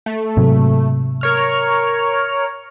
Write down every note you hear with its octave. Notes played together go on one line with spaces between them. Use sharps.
A3
G#2 C3 F#3
A#4 C#5 F6